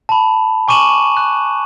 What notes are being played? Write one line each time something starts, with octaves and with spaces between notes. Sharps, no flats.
A5 B5
G#5 C#6 D6 D#7 E7 F#7
F#6